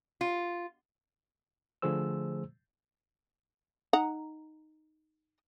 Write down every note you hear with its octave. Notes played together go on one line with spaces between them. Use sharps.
F4
D3 F3 A3 G#4 C5 E6
D#4 F#5 A#5